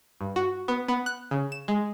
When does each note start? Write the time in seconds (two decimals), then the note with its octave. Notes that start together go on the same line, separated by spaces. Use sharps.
0.21 G2
0.36 F#4
0.68 B3
0.88 B3
1.06 F#6
1.31 C#3
1.52 E7
1.68 G#3